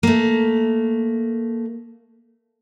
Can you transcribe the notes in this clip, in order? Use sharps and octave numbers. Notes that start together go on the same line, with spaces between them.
A3 A#3